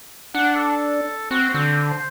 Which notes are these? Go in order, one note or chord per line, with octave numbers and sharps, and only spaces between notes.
D4 F#5
A4
C4 F#4
D3 C4
C5